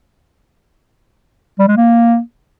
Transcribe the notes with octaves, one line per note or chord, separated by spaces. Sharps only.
G3
G#3
A#3